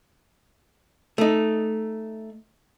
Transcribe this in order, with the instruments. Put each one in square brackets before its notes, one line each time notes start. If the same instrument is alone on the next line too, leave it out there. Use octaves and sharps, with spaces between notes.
[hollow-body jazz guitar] A3 D#4